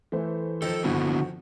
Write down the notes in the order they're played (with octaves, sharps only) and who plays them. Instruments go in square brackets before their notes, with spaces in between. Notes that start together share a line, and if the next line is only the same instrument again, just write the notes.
[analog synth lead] E3 [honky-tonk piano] A3 C5
[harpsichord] F2 D#3 [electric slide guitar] A4
[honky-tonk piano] G2 [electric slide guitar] D3 B3 E4 [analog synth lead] F#4